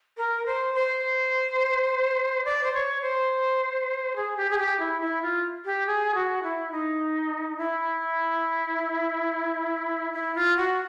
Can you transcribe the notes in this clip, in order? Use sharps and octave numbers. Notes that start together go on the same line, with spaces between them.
A#4
C5
C5
D5
C5
C#5
C5
G#4
G4
G#4
G4
E4
E4
F4
G4
G#4
F#4
E4
D#4
E4
E4
F4
F#4